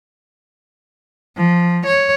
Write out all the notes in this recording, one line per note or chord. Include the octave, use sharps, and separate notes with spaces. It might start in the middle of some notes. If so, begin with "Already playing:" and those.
F3
C#5